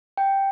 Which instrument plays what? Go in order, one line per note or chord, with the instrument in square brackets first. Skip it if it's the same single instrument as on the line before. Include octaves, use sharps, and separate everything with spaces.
[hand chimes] G5